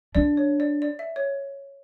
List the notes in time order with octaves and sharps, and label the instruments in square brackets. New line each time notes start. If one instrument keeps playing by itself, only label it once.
[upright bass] D4 [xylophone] D5
[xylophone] C#5
D5
D5
E5
C#5